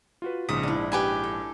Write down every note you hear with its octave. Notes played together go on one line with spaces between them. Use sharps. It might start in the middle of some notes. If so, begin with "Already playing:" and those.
F4 F#4 B4
A#1 G#2 C#3 D#6 B6
D4 E4
G4 B4 G#5
A4